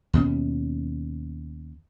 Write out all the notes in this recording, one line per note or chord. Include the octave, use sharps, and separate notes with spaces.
D#2 B2 A#3 C#4